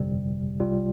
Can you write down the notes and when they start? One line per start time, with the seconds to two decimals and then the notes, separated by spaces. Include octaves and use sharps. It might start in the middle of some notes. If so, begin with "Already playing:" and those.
Already playing: G1 F2 C3 G3
0.59 C2 C3 G3 F4